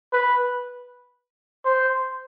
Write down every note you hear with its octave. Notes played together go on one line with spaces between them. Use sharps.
B4
C5